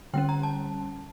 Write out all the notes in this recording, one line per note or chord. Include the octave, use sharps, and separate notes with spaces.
D3 G3 C#4 G5
A#5
A5